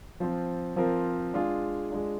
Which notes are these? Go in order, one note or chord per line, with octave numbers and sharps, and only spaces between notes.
F3 C4 F4
F3 C4 F4 A#4
G#3 D4 F4 G#4
G#3 D4 F4